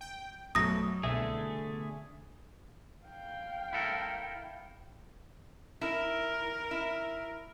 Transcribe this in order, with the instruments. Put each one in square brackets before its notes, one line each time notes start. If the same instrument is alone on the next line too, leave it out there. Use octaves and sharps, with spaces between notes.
[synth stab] G5
[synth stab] A#1 B2 A3 [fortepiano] F#2 [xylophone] D#6 A#6
[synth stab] C2 B2 [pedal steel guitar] D3 A3 G#4 [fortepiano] E5
[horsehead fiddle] F5 G5
[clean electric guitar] E4 A4 A#4
[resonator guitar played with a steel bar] E4 [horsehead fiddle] A#4
[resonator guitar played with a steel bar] E4